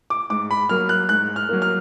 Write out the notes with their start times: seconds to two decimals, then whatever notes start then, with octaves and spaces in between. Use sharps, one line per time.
0.10 D6
0.30 G#2 D6
0.51 B5
0.69 F#3 A#3 F6
0.89 F#6
1.09 G#2 F#6
1.36 F6
1.49 F#3 A#3
1.62 F6